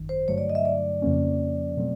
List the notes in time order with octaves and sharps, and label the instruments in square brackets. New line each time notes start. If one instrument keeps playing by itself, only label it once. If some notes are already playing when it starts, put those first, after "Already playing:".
Already playing: [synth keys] G#1 F#2 D#3
[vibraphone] C5
[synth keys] G2 D3 F#3 A3 [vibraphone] C#5
[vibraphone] D5
D#5
E5
D5
[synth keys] F2 C#3 F3 A#3 C#4
B2 F#3 A3 C4